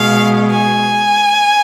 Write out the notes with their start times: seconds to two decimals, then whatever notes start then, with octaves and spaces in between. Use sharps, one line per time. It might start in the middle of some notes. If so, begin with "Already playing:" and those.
Already playing: B2 G#3 F5
0.51 G#5